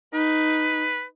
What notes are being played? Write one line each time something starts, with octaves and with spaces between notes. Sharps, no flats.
D#4 B4